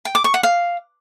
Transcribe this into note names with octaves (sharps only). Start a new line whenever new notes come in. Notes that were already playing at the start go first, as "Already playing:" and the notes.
G5
D6
C#6
F#5
F5